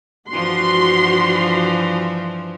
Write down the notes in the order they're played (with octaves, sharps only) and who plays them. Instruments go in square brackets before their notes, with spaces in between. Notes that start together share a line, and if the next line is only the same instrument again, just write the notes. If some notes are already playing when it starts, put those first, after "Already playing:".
[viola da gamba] G2 E3 F3 [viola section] F#4 C6